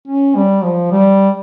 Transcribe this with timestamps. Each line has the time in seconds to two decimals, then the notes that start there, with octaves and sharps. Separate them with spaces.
0.08 C#4
0.36 G3
0.64 F3
0.91 G3